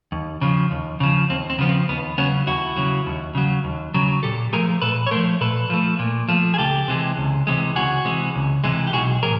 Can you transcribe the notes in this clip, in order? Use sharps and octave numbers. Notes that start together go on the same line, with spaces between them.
D#2
C#3 F3
D#2
C#3 F3
D#2 C4
C4
C#3 F3 B3
C4
D#2 B3
C#3 F#3 B3 C#4
D#2 E4 F#4
C#3 F#3
D#2
C#3 F#3
D#2
C#3 F#3
A#2 G4 A4
F3 A3 G#4 A#4
A#2 A4 B4
C#5
F3 A3 A#4 C5
A#2 A4 B4
F3 A3
A#2
F3 A3
G#4
C#2 G4 A4
C3 E3 G#3
C#2
C3 E3 G#3
C#2 F#4 G#4
C3 E3 G#3
C#2
C3 E3 G#3
G4
B1 F#4 G#4
A2 E3 G#4 A#4